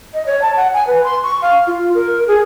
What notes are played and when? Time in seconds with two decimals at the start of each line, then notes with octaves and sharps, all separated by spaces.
0.14 D#5
0.26 C#5
0.42 A5
0.57 F#5
0.74 G#5
0.87 B4
1.04 C6
1.23 C#6
1.42 F5
1.67 F4
1.95 A#4
2.28 G#4